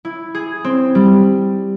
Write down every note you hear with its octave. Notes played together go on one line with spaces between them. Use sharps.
E4
G#4
C4
G3